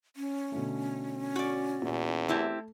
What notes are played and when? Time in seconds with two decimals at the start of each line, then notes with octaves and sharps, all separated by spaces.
0.16 C#4
0.52 B2 D3 A3
1.36 F#4 D5
1.82 E2 A#2
2.29 A3 C4 E4 G4 A5